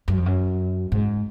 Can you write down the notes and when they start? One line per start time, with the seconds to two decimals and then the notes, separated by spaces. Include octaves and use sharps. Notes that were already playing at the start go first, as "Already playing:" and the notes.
0.08 F#2
0.17 F2
0.26 F#2
0.92 G#2